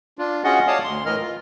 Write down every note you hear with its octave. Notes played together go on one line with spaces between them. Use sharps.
D4 F4
C#4 F4 F#4 G#4 D#5 F#5
C#5 D5 F5 A5 D#6
D2 C6
A2 E3 A#4 D#5 F6
F4